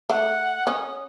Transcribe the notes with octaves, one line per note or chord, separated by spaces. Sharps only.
A3 F#5
C#4 D#6